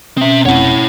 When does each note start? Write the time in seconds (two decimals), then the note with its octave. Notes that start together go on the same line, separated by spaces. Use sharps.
0.17 B2 C4 C#4 E5
0.46 F1 C4 E4 C#5 F#5